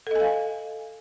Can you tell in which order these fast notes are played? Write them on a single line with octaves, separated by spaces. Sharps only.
A4 D#5 G#5 F5